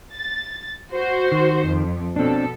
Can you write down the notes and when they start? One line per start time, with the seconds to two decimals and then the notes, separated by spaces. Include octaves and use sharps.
0.13 A6
0.91 F#4 C5
1.32 D#3
1.66 F2
2.16 B2 C4 D4 A4